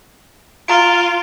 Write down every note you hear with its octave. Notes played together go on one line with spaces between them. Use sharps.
F4 A#5 D7